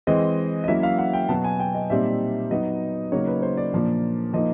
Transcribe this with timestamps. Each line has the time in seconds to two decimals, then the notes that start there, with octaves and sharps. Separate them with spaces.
0.07 E3 G#3 C4 D#5
0.64 D#5
0.68 F#3 A#3 C#4 E4 E5
0.83 F5
0.99 F#5
1.13 G5
1.29 B2 F#3 B3 A5
1.44 G#5
1.60 G5
1.74 D#5
1.90 A#2 G3 C4 D#4 E5
2.51 F#3 B3 D#4 D#5
3.12 C#3 F#3 A#3 D#4 C#5
3.27 B4
3.42 C5
3.57 D5
3.73 A#2 F3 A#3 D4
4.33 F3 A#3 D#4 D#5